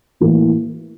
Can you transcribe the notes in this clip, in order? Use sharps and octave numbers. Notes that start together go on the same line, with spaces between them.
A2 E3 A#3